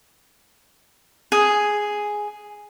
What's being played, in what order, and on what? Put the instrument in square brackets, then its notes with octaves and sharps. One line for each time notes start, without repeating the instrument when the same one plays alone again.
[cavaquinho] G#4